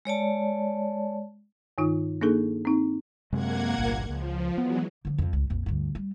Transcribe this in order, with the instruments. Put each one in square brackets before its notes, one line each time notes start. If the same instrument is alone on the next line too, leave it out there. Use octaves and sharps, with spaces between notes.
[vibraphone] G#3 C#5 D5 A5
[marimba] G2 D#3 D#4 F4
A#3 D4 D#4 G#4 A4
C4 D#4
[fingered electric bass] F#2 C3 G#3 [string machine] A#3 F#5 G#6
[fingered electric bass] G1 C2 A#2
[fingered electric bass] C#2 [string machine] F3
[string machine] E3 F#3 G#3 [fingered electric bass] B3
[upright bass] D3 F3
C2 F2
C#2
A#1 F2
D2 G2
G3